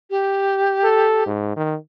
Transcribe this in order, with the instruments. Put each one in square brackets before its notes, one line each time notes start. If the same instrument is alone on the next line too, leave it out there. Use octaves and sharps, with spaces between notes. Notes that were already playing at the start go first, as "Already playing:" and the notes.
[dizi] G4
[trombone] A4
G#2
D#3